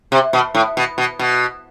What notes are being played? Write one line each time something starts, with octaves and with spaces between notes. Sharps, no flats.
C3
B2
A2
B2
B2
B2